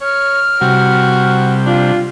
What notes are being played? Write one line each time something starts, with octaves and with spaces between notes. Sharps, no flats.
C#5 F6
C3 G3 F#4
D4 F4